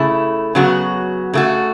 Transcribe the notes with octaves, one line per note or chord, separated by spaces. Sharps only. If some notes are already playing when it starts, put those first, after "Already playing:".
Already playing: C#3 A3 E4
C#3 F#3 B3 F#4
C#3 A3 F#4